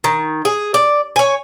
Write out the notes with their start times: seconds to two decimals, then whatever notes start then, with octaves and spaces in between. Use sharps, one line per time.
0.04 D#3
0.45 G#4
0.74 D5
1.16 C#5 G#5